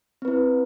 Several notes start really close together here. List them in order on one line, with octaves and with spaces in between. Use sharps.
C4 B4 E4